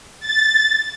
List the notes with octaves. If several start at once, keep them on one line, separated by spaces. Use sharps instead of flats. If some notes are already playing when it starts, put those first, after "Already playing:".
A6